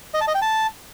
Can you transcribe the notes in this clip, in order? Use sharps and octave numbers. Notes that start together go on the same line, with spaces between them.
D#5
A5
D#5
G5
A5